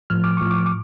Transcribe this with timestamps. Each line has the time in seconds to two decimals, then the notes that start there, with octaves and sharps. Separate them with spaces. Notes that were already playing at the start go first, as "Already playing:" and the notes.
0.10 A2 F3 F6
0.24 D6
0.37 A2 F3 C#6
0.51 D6
0.66 D6